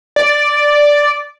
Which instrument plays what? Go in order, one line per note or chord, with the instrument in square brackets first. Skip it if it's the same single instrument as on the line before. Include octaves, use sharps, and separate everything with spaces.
[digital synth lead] D5